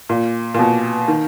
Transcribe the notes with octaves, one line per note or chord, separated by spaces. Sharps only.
A#2
A#2
B2
D#3